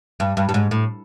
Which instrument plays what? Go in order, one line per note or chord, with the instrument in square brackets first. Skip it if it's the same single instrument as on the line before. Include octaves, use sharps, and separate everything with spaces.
[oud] G2
G2
G2
G#2
A2